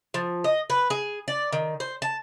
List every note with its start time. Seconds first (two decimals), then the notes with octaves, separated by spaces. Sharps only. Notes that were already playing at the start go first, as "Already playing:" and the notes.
0.14 F3
0.44 D#5
0.70 B4
0.90 G#4
1.28 D5
1.53 D#3
1.80 C5
2.02 A5